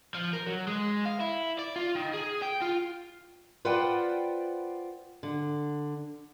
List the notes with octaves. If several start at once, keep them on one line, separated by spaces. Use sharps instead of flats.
F3
A#4
F#3
G#3
F5
E4
D5
F4
D#3
G#4
G5
F4
F4 B4 C5 D5 F#5 G5
D3